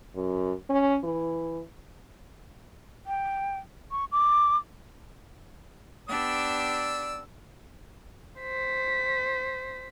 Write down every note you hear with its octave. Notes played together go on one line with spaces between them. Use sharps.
F#2
C#4
E3
G5
C#6
D6
B3 D4 G4 D5 E6
C5 B6